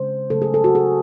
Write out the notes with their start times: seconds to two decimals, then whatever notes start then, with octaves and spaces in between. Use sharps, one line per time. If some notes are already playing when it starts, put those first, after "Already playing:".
Already playing: C#3 G#3 C5
0.30 C#3 F#3 A3 A4
0.42 G#4
0.54 A4
0.64 F#4
0.75 G#4